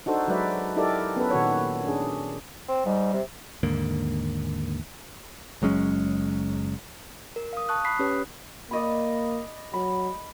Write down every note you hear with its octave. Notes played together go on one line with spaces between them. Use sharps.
D4 D#4 F#4 A4 C5
F#3 G#3 B4 D5 E5
D#4 E4 G4 A4 A#4 D5
B3 C#4 A4 B4
A#2 D#3 F#4 A4 C#5
C#4 D4 G#4
C4
G#2 G3
C3
D#2 G#2 D3 A#3
F#1 F#3 G#3 C#4
A#4
F5 D#6
A5 C#6 D#6 F#6
B5 D#6 F#6 B6 C7
C#4 G4 B4 C#5
A#3 D5 D#5 B5
F#3 B5